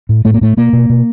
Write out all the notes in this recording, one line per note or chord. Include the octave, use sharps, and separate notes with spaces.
A2
A2 A3
A#3
A2 A3
B2 A#3
B2
B2